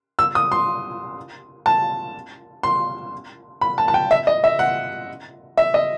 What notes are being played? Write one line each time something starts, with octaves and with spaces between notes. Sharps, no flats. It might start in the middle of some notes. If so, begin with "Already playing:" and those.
E6
D#6
C6
A5
C6
B5
A5
A5
G5
E5
D#5
E5
F#5
E5
D#5